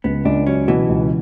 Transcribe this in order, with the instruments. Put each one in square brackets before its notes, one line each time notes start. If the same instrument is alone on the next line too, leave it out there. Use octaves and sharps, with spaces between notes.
[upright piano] C#2 [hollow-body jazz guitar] B3
[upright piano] C#2 [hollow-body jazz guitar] D4
[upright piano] F#3 [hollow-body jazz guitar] C#4
[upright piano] B2 [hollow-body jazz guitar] E3
[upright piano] C#2